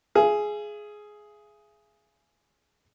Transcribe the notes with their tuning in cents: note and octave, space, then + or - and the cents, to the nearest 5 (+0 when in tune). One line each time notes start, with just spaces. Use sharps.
G#4 +10 E5 +45